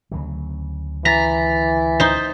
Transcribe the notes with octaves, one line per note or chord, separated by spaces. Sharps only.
D2 C#3 F#3
E3 A#5 A6 B6
D#4 C5